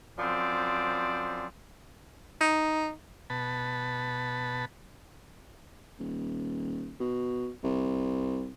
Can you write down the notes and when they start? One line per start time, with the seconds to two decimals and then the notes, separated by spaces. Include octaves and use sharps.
0.19 F#2 F3 C4 D5
2.41 D#4
3.30 B2 A5 B5
5.99 D#1
7.00 B2
7.63 C2